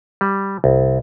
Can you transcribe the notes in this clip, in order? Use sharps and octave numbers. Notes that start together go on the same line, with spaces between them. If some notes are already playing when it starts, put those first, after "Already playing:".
G3
C2